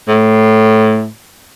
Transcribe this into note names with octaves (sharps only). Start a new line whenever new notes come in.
A2